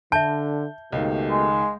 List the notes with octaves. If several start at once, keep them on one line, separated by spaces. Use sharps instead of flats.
D3 E5 A5 G6
C#2 B2 D#3 A3 G4
G#3